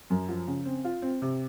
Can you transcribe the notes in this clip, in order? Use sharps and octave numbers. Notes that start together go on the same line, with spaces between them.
F#2
F3
C#3
C4
F4
C4
C3